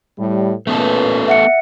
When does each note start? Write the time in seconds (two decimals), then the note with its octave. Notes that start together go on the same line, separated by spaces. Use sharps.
0.18 A2 G3
0.67 A#2 A3 B3 C#4 A4 B4
1.28 E5 F#5 C#7